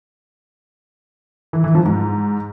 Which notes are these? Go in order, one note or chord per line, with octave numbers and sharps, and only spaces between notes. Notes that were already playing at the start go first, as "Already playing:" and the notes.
E3
E3
F3
G#2